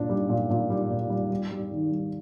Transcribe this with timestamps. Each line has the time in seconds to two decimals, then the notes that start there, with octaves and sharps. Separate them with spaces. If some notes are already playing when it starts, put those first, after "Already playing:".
Already playing: A#2 D4
0.09 G3
0.29 A#2
0.50 A#2
0.70 G3
0.90 A#2
1.10 G3
1.31 G3
1.51 G3
1.71 D#3
1.92 G3